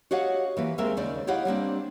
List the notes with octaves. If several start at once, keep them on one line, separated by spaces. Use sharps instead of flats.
F#4 G4 C#5 D#5 F5 F#5
E3 A#3 B4
D#2 G#3 C4 A#4 E5 F5
D#2 C#3 D5
E4 G4 C#5 D#5 F5 F#5
G3 A#3 C4 D4